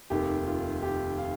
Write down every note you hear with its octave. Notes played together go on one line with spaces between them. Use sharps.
F1 D#2 D#3 G4
F4
G4
F5